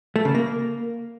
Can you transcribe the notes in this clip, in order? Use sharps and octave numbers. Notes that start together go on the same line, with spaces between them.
A3
C#3
A#3